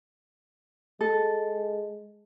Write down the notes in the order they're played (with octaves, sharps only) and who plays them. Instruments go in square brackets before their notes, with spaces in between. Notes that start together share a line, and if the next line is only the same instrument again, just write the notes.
[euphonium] G#3 [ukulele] A4